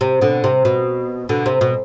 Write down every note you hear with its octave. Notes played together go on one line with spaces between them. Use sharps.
C3
B2 D3
C3
B2
B2 D3
C3
B2